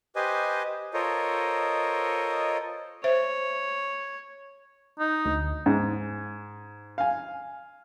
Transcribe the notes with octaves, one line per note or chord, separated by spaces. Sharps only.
G4 B4 C5 D#5 G#5
F4 A4 A#4 C5 C#5 D#5
C5 C#5 E5
D#4
D2
G#2
F5 G#5